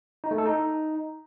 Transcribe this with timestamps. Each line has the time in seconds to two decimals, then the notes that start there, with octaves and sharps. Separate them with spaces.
0.24 D#4
0.31 A3
0.38 A4
0.46 D#4